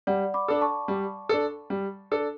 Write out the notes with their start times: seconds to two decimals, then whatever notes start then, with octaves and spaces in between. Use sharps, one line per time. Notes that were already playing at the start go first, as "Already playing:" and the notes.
0.07 G3 D5 F#5
0.34 B5 D6
0.48 D4 A4
0.61 A5 C#6
0.88 G3
1.29 D4 A4
1.70 G3
2.11 D4 A4